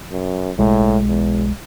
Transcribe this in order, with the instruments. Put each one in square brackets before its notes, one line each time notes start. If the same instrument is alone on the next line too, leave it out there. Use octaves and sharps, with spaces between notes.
[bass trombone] F#2
[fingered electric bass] B1 G#3 [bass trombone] A2
[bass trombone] E2